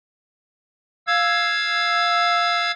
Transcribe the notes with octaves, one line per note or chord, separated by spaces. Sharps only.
F5 E6 G#6